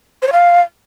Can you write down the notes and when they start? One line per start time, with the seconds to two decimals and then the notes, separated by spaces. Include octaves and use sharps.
0.22 C5
0.27 C#5
0.32 F5